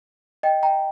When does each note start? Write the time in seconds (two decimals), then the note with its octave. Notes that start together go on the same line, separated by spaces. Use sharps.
0.43 D#5 G5
0.63 G5 A#5